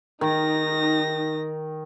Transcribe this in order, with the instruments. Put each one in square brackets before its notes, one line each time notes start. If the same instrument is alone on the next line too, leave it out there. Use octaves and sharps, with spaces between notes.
[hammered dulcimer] D#3 [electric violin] D#4 A#6